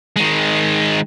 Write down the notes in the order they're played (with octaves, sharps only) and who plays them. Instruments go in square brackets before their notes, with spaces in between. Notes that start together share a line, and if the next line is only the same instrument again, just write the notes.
[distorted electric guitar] D#3 G#3